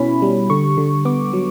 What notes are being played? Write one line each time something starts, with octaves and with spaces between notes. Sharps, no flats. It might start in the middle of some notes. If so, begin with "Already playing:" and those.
Already playing: B2 C#4 E4 B5
G3
D3 C#6
D3
B3 D6
F#3